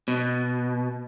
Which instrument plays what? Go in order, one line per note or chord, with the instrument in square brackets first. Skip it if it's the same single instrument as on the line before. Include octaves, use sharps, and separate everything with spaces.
[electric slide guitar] B2